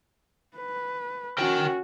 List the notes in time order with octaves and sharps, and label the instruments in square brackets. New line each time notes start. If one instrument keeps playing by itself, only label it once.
[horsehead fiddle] B4
[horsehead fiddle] C#4 F#4 [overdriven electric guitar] A#4 G5